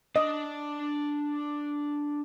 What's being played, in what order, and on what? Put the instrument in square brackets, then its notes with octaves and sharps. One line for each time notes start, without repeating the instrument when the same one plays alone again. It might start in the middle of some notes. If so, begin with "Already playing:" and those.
[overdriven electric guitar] D4 D5 [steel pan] D#5